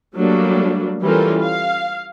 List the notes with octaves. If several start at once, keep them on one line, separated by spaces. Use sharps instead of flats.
F#3 G3 A3 A#3 D4
E3 G3 C#4 F4 A4 A#4
F5